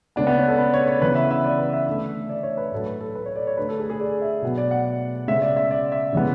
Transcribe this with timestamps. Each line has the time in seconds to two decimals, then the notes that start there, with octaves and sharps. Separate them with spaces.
0.16 C#3 G#3 B3 D4
0.27 B3
0.38 C#4
0.48 A4
0.58 B4
0.74 C#5
0.88 C#5
1.01 C#3 E3 B3 B4
1.15 E5
1.31 E5
1.44 D5
1.58 B4
1.73 E5
1.86 D3 A3
2.29 D5
2.43 C#5
2.58 B4
2.72 A2 F#3 A3 A4
2.86 B4
3.01 A4
3.15 B4
3.26 C#5
3.36 D5
3.47 C#5
3.58 D3 A3 B4
3.69 A4
3.79 G#4
3.90 G#4
4.00 D5
4.21 E5
4.42 B2 F#3 B3
4.58 D5
4.71 F#5
5.28 C#3 G#3 B3 E5
5.42 D5
5.56 E5
5.71 D5
5.92 E5
6.13 C#3 E3 G#3 B3